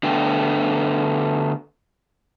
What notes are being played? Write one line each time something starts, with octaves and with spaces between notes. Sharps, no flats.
D3 A3 B3 D4 G5